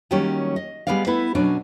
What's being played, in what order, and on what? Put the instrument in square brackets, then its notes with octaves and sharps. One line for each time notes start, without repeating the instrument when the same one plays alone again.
[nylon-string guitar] D#3 F#3 G3 A#3 C#4 G4
D#5
G3 G#3 B3 A#4 D5 F5
B3 E4 A4 B4
B2 F#3 C#4 D4